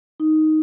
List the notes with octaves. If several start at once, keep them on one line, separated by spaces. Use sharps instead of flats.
D#4